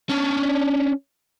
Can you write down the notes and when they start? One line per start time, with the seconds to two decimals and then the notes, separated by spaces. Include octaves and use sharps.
0.09 C#4 D4